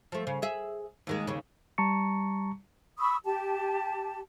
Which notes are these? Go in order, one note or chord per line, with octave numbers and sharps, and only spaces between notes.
F3 A3
C#3
G#4 E5
D#2 D#3 G#3
D#2 C#3
G3 A5 A#5 C#6 C#7
B5 C#6 D#6 E6
G4 A5